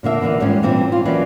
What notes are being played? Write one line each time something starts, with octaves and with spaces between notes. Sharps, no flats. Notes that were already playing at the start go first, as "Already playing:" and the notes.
A#2 D3 A#3 E5
D3 E3 A#3 B3
E2 G#2 F3 G3 C#4
A#2 E3 G3 C4 D4
F4
E3 F#3 A#3 C#4 B4 D5